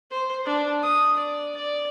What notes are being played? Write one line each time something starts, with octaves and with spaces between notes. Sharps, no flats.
C5
D4
D#6
D5
D5